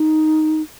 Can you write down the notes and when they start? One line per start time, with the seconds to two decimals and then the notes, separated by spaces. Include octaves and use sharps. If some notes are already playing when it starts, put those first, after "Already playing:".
Already playing: D#4